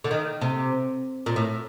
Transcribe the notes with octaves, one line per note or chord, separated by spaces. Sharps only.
D3
D#3
C3
A#2
A2